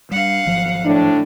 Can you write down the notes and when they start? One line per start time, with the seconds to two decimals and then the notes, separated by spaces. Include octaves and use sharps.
0.11 G3 D4 F5 F#5
0.47 G#1 F3 F#3
0.86 A2 D4